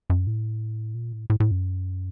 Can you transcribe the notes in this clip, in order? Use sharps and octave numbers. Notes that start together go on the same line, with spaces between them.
F#2
A2
A#2
A2
A2
A2
F#2